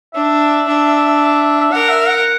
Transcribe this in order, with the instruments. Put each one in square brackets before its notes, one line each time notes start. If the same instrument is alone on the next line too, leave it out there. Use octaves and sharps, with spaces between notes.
[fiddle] D4 [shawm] E5
[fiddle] D4
[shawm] E5
[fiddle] A#4 [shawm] F#5
[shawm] E5
F#5